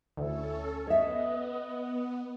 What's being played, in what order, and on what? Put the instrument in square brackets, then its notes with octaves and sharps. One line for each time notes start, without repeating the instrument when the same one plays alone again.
[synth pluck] D2 [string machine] C#4 A4 [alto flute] E4
[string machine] B3 [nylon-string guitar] C#5 E5 [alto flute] D#5